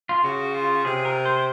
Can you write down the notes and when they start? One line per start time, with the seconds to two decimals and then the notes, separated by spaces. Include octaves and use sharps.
0.09 F4
0.24 C#3 F#4
0.55 F4
0.85 C3 G#4
1.05 A#4
1.25 C5
1.38 C5